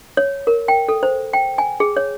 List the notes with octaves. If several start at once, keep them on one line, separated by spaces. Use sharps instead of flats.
C#5
A#4
G5
A4
C5
G5
G#5
G#4
C#5